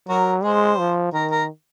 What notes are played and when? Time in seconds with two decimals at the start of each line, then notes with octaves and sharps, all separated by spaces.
0.09 F#3 F#4 A#4
0.43 G#3 G#4 C5
0.79 F3
1.13 D#3 A#4
1.31 A#4